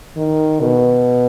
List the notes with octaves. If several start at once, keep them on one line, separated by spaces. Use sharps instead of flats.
D#3
B2